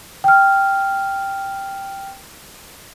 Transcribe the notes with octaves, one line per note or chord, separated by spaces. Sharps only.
G5 F6